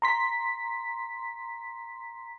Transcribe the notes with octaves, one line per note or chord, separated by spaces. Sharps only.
A#5 C6 B6